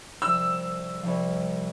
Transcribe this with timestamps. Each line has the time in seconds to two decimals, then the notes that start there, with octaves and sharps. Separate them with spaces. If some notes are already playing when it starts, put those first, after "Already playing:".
0.22 C2 C3 F3 E6
1.03 C2 C3 F3